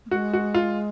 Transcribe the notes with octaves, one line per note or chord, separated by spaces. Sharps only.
A#3
G#3 F#4
F#4
F4